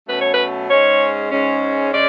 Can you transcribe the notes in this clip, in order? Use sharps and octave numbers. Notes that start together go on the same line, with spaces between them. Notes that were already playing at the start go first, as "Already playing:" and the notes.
B2 F#3 A3 C#4 B4
C#5
B4
G#2 G#3 C#4 C#5
G#2 G#3 C#4
C#3 G#3 C#4 D5